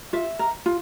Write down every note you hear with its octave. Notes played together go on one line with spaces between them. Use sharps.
F4 E5
A#4
F4